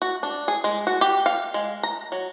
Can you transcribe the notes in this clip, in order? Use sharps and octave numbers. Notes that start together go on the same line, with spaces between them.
F#4
D4
G#4
G#3
F#4
G4
F5
G#3
A#5
F#3